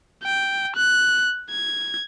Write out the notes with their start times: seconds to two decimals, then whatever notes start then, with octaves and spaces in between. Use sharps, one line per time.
0.24 G5
0.77 F#6
1.50 G#6